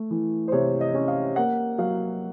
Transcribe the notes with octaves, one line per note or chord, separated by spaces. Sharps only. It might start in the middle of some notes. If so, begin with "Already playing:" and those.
Already playing: A3
E3
C5
C3 C#5
D#5
C#4
F5
A#3 F#5
F#3 F5